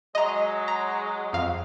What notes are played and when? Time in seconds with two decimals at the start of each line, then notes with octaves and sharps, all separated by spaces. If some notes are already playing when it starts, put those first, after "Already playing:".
0.15 F#3 G#3 D#5 A#5
0.68 A#5
1.33 F2 F5